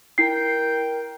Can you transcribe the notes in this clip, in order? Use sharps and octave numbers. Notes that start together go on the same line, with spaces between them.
E4 A#4 G5 C7